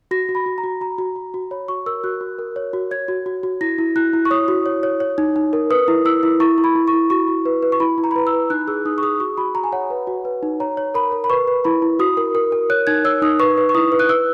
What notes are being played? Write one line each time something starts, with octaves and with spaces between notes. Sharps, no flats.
F#4 A#6
F#4
B5
F#4
A#5
F#4
F#4 A#5
F#4
F#4
F#4
C#5 B5
F#4 C#6
A#4 E6
F#4 F#6
F#4
A#4
C#5
F#4
C#5 G#6
F#4
F#4
F#4
E4 A#6
E4
E4 F#6
E4
C#6
C#5 D#6
F#4
C#5
C#5
C#5
D#4
D#4
A#4
B4 D#6
E4
E4 E6
E4
E4 C#6
E4
B5
E4
C#6
E4
F#4 C#6
F#4
B4
B4
C#6
E4 B5
E4
A#5
B5
B4 A#5
E6
B4
D#4 F#6
G#4 E6
D#4 D#6
C#6
G#4 D#6
F#4 C#6
F#4 B5
F#4 A#5
G#5
C#5 F#5
B4
F#4
B4
D#4
C#5 A#5
C#5
A#4 B5
A#4
B5
B4 C#6
B4
E4 B5
E4
F#4 D#6
A#4
A#4
A#4
C#5 F#6
D#4 G#6
C#5 E6
D#4 D#6
B4 C#6
B4
C#6
E4 D#6
B4
F#6
B4 E6